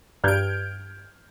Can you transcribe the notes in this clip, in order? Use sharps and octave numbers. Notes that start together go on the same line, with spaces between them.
G2 F6 G6 G#6 D7